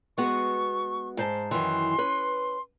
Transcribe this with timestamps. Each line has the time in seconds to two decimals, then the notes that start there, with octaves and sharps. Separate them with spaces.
0.18 G#3 B3 F#4 C#6
1.17 G#2 C5 A5
1.51 F#2 D#3 E3 C6
1.98 C#4 B4